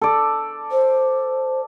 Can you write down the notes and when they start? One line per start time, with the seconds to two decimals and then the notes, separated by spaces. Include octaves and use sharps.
0.01 A4 D5
0.72 C5